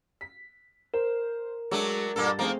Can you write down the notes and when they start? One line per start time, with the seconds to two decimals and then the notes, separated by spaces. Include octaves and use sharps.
0.21 B6
0.94 A#4 C5
1.71 F#3 G#3 A3 D4
2.16 G2 A#2 A#3 A4
2.39 F3 A3 A#3 C4 D#4 G#4